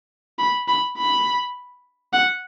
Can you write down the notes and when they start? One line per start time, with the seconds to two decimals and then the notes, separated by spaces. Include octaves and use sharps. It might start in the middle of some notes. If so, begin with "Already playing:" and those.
0.39 B5
0.68 B5
0.97 B5
2.13 F#5